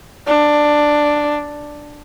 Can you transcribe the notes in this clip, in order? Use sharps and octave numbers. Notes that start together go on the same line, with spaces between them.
D4